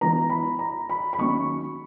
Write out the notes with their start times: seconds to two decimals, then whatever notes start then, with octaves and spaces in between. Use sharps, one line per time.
0.01 E3 B3 A#5
0.30 B5
0.59 A#5
0.89 B5
1.13 B5
1.18 D#3 F#3 A#3 C#4 C#6